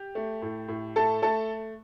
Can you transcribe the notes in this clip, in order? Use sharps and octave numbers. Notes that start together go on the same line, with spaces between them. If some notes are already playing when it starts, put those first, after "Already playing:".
Already playing: G4
A3
A2
A2
A3 A4 A5
A3 A4 A5